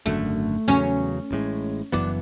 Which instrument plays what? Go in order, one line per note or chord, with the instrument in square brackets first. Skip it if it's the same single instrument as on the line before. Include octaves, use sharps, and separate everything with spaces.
[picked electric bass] G#1 F#2 D3 [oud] A3
[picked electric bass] E2 C#3 F#3 [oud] C#4
[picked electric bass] A1 A2 G#3
[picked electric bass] F#1 F#2 E3 B3 [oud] D4